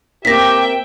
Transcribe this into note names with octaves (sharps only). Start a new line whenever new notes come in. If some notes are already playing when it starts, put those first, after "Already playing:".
A#3 C4 G4 C5 E5 G5 A#6 B6